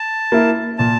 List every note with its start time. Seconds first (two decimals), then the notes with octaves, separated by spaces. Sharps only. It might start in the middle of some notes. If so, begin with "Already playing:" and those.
Already playing: A5
0.32 A#3 E4
0.78 A#2 A5